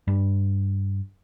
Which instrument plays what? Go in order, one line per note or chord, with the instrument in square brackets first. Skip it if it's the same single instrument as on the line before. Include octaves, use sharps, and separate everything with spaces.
[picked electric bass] G2